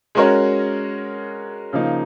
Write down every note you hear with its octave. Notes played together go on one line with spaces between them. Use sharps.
G#3 C#4 F#4 A#4 C#5
C#3 F3 A#3 D#4